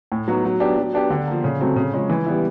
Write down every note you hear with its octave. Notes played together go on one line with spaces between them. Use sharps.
A2
F#3 B3 D#4 F#4
F#3
B3 D4 G4
F#3
B3 D4 G4
D3
F3 A#3
C#3
F#3 A3 C4
C#3
F3 G#3 C#4
E3
G3 B3 E4